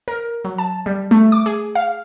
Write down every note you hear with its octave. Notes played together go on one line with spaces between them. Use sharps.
A#4
F#3
A5
G3
A3
D6
G#4
F5